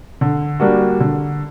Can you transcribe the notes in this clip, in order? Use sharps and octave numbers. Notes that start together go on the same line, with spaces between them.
D3
G3 A#3 D4 F#4
D3